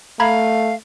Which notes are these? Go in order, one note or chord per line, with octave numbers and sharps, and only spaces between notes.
A3 F5 A#5 B5 G#6